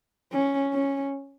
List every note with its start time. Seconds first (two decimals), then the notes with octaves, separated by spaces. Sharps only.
0.33 C#4
0.74 C#4